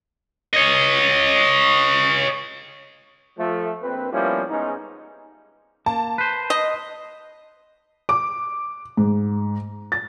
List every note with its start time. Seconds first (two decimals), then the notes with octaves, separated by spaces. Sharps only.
0.53 C#5 D#5
3.38 F3 A3
3.82 A#1 C4 B4
4.12 F3 G3 A#3 B3 C#4 E4
4.49 G#2 G#3 B3 C#4 D#4
5.86 A#3 A5
6.18 B4 C5
6.50 D#5
8.09 D6
8.97 G#2
9.92 A6